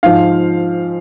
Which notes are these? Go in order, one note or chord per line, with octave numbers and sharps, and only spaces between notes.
G#2 F3 F5